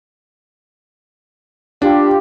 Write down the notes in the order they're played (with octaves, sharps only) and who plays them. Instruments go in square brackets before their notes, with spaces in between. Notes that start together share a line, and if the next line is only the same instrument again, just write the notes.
[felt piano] D4 [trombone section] F4 G4